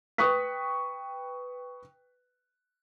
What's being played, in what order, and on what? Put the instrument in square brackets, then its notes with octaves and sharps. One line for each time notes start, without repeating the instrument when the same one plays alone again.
[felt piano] B4 G5 C#6 D#6 F#6 B6